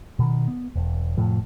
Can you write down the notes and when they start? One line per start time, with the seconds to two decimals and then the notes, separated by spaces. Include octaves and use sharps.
0.19 B2 D#3
0.48 B3
0.76 E1
1.17 F1 A2 F3